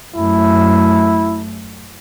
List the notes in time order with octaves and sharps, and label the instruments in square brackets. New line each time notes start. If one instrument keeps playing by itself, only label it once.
[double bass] F#2 A3 [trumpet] E4